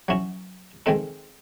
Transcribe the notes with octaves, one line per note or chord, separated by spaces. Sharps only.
F#3 C#4 E4
D#3 G#3 C4 D#4 A4